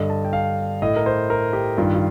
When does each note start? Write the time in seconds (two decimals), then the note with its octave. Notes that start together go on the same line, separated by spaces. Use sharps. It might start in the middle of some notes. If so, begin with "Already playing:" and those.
Already playing: G2 D3 D#5
0.10 A5
0.25 G5
0.33 F5
0.82 A2 D#5
0.96 A#4
1.06 C5
1.30 A#4
1.53 G4
1.78 G2 D#3 F4
1.95 F4